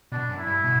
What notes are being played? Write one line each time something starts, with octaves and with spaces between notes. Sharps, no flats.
B2 D4
F#2
E4
G2
B2